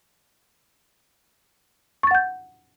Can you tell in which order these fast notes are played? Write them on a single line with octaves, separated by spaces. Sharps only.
C#6 A6 F#5 G6